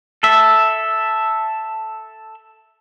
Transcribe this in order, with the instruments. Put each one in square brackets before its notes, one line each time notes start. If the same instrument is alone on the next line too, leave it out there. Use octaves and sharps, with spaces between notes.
[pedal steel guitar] A4 E5